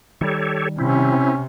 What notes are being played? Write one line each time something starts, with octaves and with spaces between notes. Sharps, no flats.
D#3 G3 G4 A4 C#5
C3 C4 C#4 E4